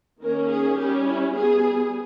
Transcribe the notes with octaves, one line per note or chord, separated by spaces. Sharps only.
D#3 A#3 C#4 A#4
G#4
G3 C#4 G4
E4
G3 B3 G#4